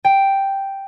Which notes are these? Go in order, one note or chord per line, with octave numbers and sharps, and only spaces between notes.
G5